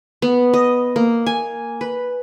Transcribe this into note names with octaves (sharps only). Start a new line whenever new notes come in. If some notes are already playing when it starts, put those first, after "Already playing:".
B3
D#5
A#3
G#5
B4